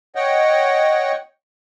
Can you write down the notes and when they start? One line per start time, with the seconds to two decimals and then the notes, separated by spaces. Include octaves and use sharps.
0.15 C#5 D#5 F#5 G5